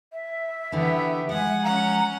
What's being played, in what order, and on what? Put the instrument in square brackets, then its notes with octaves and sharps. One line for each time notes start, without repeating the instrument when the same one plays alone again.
[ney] E5
[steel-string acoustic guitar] D3 E3 D4 [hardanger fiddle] B3 G4
[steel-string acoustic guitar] F3 G#3 [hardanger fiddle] F#5 G#5
[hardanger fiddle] C#4 F#5 [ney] A#5